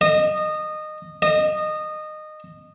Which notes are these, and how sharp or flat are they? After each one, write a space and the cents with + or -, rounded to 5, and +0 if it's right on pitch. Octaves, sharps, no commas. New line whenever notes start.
D#5 -20
D#5 -20